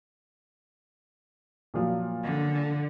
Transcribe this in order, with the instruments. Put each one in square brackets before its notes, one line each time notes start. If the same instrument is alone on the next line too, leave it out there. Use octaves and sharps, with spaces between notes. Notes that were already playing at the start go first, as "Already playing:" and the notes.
[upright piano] A#2 F3 F#3
[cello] D3